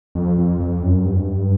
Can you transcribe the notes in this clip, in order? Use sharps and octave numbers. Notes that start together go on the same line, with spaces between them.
F2
F2
F2
F#2
G2